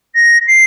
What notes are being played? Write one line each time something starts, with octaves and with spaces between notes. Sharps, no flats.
A#6
C7